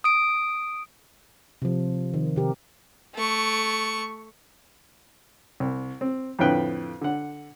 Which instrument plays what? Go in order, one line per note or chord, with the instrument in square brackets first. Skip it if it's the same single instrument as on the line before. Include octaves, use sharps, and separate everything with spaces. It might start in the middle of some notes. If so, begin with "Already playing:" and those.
[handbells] D#6 D7
[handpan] C3 F3
D#3
C3 G4 A#4
[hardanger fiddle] A3 C#6
[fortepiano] C2
C4
F2 A2 D3 B4 G5 F#6
D3 F#5